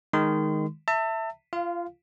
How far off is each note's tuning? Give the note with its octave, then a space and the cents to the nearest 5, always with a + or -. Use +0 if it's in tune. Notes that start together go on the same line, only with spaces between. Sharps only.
D#3 +0 G#3 +0 C6 -35
E5 +0 A5 +35
F4 -25 F5 +0